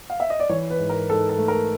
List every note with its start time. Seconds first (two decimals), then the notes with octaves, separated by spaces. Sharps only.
0.10 F5
0.20 E5
0.30 D#5
0.40 D5
0.49 E3 C#5
0.70 B4
0.79 G#2
0.89 A#4
1.09 G#2 A4
1.29 A4
1.39 A3
1.48 A#4